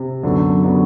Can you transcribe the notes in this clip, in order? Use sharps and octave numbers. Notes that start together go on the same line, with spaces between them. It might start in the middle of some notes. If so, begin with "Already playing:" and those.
Already playing: C3
F#2 D3 F#3 B3
D3 F#3 B3